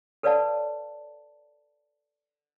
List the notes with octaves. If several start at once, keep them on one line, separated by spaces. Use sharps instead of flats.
A4 B4 C#5 D5 F5 A5